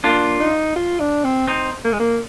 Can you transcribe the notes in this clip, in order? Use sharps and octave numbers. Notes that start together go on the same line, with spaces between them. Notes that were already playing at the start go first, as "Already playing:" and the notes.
A#3 D4 F4
D#4
F4
D4
C4
C4 D#4
A#3
G#3
A#3